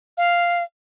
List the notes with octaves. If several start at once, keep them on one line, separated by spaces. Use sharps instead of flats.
F5